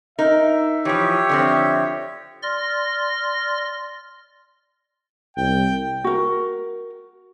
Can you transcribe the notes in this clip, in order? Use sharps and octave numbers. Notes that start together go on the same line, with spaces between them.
D#4 A#4 E5
E3 F3 G4 C#5
D3 F3 C4
D5 C6 F6 A#6
C2 G5
F#4 A#4